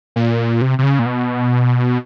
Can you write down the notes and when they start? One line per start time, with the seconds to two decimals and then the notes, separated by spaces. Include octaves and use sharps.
0.16 A#2
0.61 C3
0.78 C3
0.83 C#3
0.99 A#2
1.06 B2